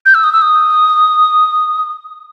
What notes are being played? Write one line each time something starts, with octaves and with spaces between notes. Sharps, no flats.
G6
E6
D#6
E6
D#6